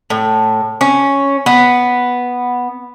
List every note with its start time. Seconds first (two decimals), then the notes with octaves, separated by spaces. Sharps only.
0.10 A2
0.81 C#4
1.46 B3